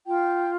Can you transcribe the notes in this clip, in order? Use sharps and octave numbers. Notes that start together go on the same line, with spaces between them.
F4 G5